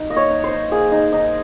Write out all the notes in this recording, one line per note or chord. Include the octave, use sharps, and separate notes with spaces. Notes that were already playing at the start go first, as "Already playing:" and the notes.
Already playing: D#4
A#3 D#5
C#5
D#4
C5
D#4
A#3 G#4
D#4
D#4